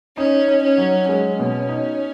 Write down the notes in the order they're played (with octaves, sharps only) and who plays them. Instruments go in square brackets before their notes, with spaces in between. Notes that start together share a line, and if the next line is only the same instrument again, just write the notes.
[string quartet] C#4 [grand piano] D#4
[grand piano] D#4
[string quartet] C#4
[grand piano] F#3
[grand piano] G#3 [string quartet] C#4
[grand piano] B2
D#4